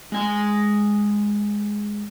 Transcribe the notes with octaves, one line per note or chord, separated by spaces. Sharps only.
G#3 G#5